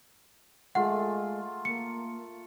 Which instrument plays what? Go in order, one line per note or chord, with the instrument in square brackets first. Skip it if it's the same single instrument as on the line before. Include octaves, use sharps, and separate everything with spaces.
[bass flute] G#3 [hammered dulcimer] A3 F4 [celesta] F#5
[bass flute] A#3 [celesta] C#7